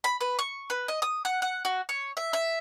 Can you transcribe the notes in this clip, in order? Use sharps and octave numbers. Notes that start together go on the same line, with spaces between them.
B5
B4
C#6
B4
D#5
D#6
F#5
F#5
F#4
C#5
E5
E5